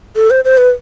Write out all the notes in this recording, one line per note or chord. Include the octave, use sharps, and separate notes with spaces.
A4
C5
C5
B4